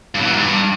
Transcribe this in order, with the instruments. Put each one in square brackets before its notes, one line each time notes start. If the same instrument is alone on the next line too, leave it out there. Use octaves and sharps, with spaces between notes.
[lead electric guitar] G2
B2
E3
G#2
G2